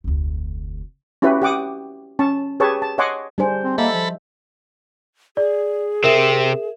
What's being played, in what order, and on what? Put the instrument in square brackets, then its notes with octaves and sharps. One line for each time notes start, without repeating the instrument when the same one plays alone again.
[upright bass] F1 D2
[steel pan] C#4 E4 F#4 G4 B4
G4 F#5 D6 D#6
C#4 A5 C#6
G4 G#4 B4 C#5 A5 C#6
A5
C#5 D#5 F#5 G#5 C6 D6
[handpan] G3 D4 C5 [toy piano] D#4 G#4 G#5
[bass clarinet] C4
[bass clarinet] A#3 [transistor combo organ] A4 B5 [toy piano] D#5 [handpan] E5
[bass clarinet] F3
[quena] G#4 [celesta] D5
[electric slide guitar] C3 C4 [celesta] A#4 E5 E7